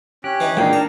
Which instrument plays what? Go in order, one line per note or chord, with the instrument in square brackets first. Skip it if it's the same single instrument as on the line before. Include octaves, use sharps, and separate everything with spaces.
[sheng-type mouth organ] C#4 F#6 [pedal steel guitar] G4
[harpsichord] E3 D#4
[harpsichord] A#2 [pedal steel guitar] G#3 D#4 G#4 [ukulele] D4 F4 G5
[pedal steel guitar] D#4 A5 [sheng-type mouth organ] A#4 [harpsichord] A#5